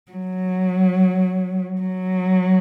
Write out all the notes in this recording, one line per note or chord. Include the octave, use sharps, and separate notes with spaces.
F#3
F#3